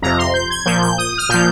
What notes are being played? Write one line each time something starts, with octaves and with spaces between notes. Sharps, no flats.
F2 C3 F3 A#5
C6
G6
G#6
A#2 F3 G6
G6
D#6
F6
A#2 F3 G6